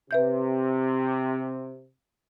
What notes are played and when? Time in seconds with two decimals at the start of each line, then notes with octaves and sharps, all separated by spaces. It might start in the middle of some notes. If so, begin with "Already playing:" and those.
0.11 C3 B4 E5 G6